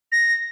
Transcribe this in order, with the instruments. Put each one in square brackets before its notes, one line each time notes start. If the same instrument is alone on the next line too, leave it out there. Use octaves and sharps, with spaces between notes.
[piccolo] A#6